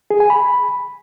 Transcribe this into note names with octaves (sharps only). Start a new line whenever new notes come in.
G#4
G#5
B5